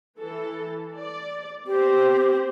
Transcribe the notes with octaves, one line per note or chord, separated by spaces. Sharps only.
E3 A4
D5
B3 C4 G4 C5